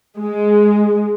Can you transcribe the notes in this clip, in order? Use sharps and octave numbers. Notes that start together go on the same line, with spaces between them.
G#3